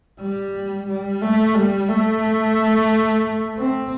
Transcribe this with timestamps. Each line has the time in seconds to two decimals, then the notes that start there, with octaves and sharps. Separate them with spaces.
0.20 G3
0.87 G3
1.21 A3
1.55 G3
1.89 A3
3.58 C4